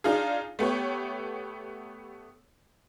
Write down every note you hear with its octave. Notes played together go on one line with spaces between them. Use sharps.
D4 D#4 F4 G#4
A3 B3 G4 C#5